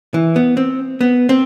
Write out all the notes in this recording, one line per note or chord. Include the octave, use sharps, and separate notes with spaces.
E3
B3
C4
B3
C4